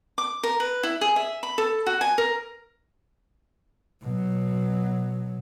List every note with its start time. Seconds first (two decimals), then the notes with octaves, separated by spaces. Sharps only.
0.18 D6
0.43 A#4
0.60 B4
0.83 E4
1.01 G#4
1.16 E5
1.43 B5
1.58 A4
1.87 F#4
2.01 G#5
2.18 A#4
4.02 B2 F#3